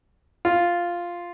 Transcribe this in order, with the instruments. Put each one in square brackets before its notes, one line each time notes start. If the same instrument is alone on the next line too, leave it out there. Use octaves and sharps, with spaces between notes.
[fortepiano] F4